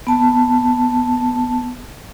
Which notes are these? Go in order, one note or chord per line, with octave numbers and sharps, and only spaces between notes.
B3 A5